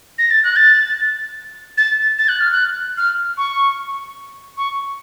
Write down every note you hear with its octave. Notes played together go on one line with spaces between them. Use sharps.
A#6
A6
F#6
A6
A6
A6
F#6
F6
F#6
F6
C#6
C#6